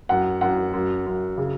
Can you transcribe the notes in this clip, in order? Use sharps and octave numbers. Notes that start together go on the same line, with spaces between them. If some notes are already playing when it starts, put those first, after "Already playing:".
F#2 F#5
F#2 F#5
F#2
F#2
C#3